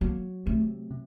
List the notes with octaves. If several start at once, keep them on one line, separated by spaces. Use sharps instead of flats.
F#3 A#3
C3 A3
C3